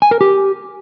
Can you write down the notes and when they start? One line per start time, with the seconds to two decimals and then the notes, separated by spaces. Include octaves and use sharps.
0.02 G#5
0.11 A#4
0.21 G4